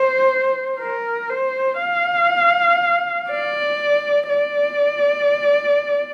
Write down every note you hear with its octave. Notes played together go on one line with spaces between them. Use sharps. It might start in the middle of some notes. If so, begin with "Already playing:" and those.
Already playing: C5
A#4
C5
F5
D5
D5